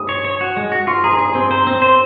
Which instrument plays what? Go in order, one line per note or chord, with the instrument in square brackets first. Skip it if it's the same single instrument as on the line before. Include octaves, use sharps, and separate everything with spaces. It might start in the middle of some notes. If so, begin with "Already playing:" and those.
Already playing: [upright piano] D#6
[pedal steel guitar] C#5
C#5
F#4
G#3
F#4
[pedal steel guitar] F4 [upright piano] C#6
[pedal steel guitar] G#4 [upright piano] A#5
[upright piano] C6
[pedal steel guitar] G#4
[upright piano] C6
[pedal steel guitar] C4
[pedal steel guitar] C5 [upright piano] A#5
[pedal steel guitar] C4
C5